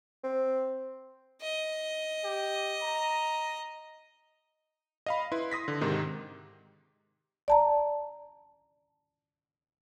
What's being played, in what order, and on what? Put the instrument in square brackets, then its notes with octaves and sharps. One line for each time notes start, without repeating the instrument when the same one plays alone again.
[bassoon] C4
[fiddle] D#5
[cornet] G4
A#5
[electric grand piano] D#5 F5 B5
E4 B4 C6
C6 D#6 A#6 B6
D3
G#2 C3 D#3
[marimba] D5 A5 A#5